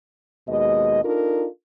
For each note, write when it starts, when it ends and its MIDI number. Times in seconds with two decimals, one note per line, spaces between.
0.48 1.03 39
0.48 1.03 47
0.48 1.03 56
0.48 1.03 75
1.03 1.47 62
1.03 1.47 63
1.03 1.47 65
1.03 1.47 69
1.03 1.47 70